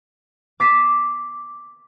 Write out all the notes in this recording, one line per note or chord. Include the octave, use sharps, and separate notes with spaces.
D6 A6 B6 C7 D#7 E7